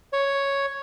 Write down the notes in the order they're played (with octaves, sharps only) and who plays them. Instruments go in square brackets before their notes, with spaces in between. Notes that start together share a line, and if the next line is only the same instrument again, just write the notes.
[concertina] C#5